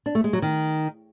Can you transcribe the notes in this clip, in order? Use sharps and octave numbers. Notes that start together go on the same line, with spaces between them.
D4
A3
G#3
F#3
D#3